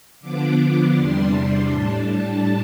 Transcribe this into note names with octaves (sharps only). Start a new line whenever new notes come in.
D3 F3 B3 D4 D6
E2 C3 G3 D4 C6
A2 G3 D4 A5